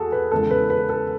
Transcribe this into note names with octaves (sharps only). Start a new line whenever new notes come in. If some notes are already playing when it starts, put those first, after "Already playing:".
Already playing: E2 F#4 G#4 A4
B4
E2 C#3 G#3 A4
B4
B4
A4